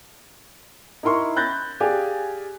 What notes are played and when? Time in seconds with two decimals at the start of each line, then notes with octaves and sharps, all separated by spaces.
1.03 D#4 E4 A#4 C6 C#6
1.36 B5 F#6 G6 A6 A#6
1.80 G4 G#4 D5 F5 G#5